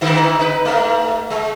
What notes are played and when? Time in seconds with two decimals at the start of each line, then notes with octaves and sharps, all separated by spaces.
0.01 G#2 D3 E4
0.39 D#4 B4
0.65 G#2 A3
1.30 G#3